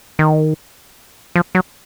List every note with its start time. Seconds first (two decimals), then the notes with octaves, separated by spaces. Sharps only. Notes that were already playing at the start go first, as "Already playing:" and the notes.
0.19 D#3
1.36 F3
1.55 F#3